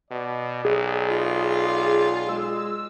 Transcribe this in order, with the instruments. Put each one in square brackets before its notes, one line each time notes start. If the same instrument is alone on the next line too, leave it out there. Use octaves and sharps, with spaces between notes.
[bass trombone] B2 [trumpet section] D5
[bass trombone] B1 [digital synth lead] G#4
[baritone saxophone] F4
[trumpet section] G#3 [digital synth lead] E6